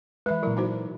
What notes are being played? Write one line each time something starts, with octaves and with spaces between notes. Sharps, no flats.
E3 G#3 B4 E5
A#2 F#3 E4 A#4
D#4 F#4 C5